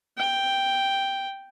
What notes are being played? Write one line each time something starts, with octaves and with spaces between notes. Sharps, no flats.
G5